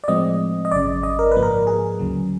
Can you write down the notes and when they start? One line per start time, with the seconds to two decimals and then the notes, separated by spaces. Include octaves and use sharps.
0.04 D5
0.08 A2 F3 G#3 C4 D#5
0.65 D#5
0.72 G#1 F#2 C#3 D5
1.03 D#5
1.19 A#4
1.32 G#2 F3 A#3 B4
1.43 A#4
1.67 G#4
1.99 D2 C#3 F#3